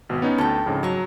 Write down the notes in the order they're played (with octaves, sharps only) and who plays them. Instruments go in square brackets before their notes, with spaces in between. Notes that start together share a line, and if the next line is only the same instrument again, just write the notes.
[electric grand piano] G#1 B2
B3 C#4 D#4
[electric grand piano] D2 [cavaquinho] A4 G5
[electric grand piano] F2 G#2 C#3
[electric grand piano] F#3 [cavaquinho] A#5 C#6